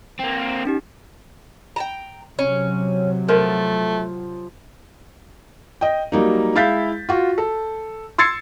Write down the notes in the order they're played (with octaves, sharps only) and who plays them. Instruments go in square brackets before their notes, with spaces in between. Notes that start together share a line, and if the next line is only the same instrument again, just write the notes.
[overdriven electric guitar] A#3 C4
[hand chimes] C#4 D#4 G4
[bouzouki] G5 A5 A#5
[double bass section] C3 F#3 [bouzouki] C#4
[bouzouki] F3 [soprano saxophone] A3 [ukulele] A#4
[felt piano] D#5 G5
F#3 G3 A#3 D#4
G#3 E4 F5 G6 A6 B6
F4 F#4
A4
C6 E6 G#6 A6 C7 C#7